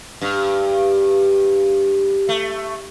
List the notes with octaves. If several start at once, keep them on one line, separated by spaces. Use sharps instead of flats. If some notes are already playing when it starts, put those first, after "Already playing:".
G2
A3